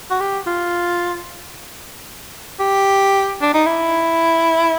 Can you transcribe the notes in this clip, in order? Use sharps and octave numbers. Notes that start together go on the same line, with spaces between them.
F#4
G4
F4
G4
D4
D#4
E4